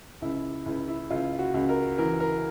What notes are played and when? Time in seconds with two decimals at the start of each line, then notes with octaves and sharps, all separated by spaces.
0.22 C#2 E4
0.66 C#2 E4
0.88 E4
1.10 C#2 F4
1.39 F#4
1.54 C#2
1.69 A#4
1.98 E3 A#4
2.20 A#4